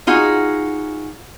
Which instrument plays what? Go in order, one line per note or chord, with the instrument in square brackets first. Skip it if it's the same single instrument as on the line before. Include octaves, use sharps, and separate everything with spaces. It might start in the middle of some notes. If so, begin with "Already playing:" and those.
[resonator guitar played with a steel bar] D#4 F4 F#4 G#4